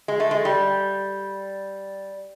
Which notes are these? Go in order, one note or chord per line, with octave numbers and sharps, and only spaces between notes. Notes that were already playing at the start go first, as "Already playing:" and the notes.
G#3
A3
G#3
G3